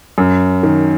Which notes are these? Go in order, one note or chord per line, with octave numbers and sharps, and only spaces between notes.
F#2
D#3